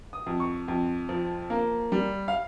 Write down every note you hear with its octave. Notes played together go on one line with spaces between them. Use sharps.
D#6
F2
C#6
F2
F3
A#3
G3
F5